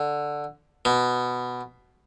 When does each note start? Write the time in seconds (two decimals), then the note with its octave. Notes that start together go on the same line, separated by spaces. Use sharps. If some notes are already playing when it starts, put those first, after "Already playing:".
Already playing: D3
0.85 B2